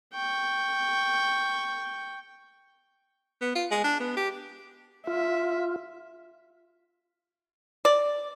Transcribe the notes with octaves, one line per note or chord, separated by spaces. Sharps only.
G5 C#6
B3
F4
G#3
D4
B3
G4
F4 E5
D5